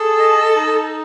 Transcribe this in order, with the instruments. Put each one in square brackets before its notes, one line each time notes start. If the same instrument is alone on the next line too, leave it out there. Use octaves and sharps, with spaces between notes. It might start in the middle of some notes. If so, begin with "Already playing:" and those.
Already playing: [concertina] G#4 [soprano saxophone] A4
[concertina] D#5
D#4